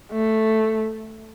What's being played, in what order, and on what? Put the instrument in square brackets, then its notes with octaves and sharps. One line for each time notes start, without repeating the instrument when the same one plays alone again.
[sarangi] A3